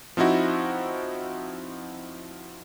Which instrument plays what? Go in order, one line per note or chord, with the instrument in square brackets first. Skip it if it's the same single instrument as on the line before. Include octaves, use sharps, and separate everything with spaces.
[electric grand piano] F3 C4 D#4 E4 F#4